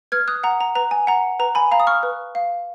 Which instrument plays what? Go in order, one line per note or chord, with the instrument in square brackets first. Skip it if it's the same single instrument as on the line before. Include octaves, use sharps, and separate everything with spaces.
[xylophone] B4 F6 G#6
D#6 F#6
F#5 A#5
A#5
B4 A#5
G#5
F#5 A#5
B4 A#5
G#5 B5
F5 A#5
D#6
C#6 F6
B4
F5